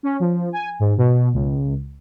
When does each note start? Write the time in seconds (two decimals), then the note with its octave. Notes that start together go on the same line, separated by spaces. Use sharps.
0.03 C#4
0.20 F3
0.52 G#5
0.80 G#2
0.97 B2
1.33 C#2